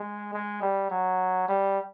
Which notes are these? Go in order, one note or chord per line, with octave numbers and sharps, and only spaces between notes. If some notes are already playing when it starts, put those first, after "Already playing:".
Already playing: G#3
G#3
G3
F#3
G3